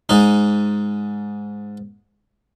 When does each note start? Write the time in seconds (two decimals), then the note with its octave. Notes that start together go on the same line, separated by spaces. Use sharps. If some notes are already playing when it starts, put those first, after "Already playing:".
0.09 G#2 D#4